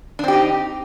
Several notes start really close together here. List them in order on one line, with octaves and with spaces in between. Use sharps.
D4 C4 G4 D#4